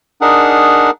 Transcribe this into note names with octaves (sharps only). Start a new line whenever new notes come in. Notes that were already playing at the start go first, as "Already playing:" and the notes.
D4 D#4 G#4 A#4 F#5